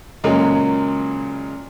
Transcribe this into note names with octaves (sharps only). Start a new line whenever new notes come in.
A#2 C#3 F#3 G#3 A#3